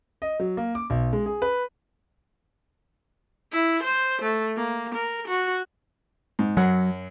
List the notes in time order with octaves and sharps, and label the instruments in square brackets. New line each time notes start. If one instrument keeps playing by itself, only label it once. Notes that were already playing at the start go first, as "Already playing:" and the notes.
[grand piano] D#5
F#3
A#3
D6
B1
G#3
G#4
B4
[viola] E4
C5
A3
A#3
A#4
F#4
[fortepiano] G#2
[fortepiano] F#2 F#5 [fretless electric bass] F#3